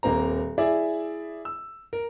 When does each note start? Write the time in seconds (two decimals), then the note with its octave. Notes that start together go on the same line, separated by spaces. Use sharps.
0.03 D#1 A#3 C4 A#5
0.58 E4 G#4 D5 E5
1.45 E6
1.93 A#4